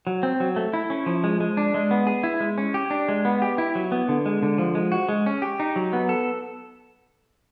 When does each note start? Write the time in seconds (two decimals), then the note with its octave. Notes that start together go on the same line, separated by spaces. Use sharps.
0.07 F#3
0.23 C4
0.40 F#3
0.56 A3
0.73 E4
0.90 C#4
1.06 F3
1.24 G#3
1.40 G#3
1.57 D4
1.74 G#3
1.91 B3
2.07 G#4
2.23 E4
2.40 G#3
2.58 C#4
2.74 G4
2.91 D4
3.08 G#3
3.25 B3
3.42 G4
3.58 E4
3.75 F#3
3.92 B3
4.09 D3
4.26 G#3
4.43 D3
4.58 F3
4.75 G#3
4.92 F#4
5.09 G#3
5.26 C#4
5.42 G4
5.60 D#4
5.76 F#3
5.93 B3
6.09 A4